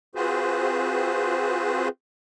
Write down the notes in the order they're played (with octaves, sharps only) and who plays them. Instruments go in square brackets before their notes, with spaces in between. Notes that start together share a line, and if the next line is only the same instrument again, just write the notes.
[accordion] C4 F4 F#4 G#4 B4 C5